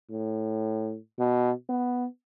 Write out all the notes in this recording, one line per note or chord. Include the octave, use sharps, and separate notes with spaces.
A2
B2
B3